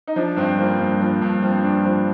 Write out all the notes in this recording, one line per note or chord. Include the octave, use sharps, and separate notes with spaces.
D#4
F3 D4
G2 C4
F3 A#3
G2
F3
G2
F3 C4
G2 D4
F3